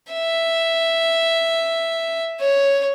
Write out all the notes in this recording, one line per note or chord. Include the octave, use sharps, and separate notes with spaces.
E5
C#5